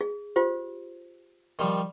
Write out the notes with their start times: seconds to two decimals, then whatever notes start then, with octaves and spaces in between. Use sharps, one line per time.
0.01 G#4
0.36 F4 G4 C5
1.59 D#3 F3 G3